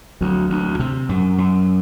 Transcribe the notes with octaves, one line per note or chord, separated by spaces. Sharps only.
D2 F#3
D2
C3
F#2
F#2